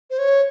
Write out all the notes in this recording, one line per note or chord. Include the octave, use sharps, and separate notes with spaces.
C5
C#5